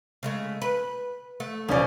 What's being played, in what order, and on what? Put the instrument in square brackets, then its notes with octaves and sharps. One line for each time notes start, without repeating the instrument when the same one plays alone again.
[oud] C#3 G#3 A3
B4
A3
[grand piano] E1 C#4 D5 [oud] C#3 F3